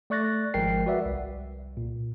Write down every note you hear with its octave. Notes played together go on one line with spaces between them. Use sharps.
A3 D5 C#6 F#6 A6 A#6
G#1 F3 G#3 A#4 G5 C7
F#4 B4 D5 E5 F#5
C2
A#2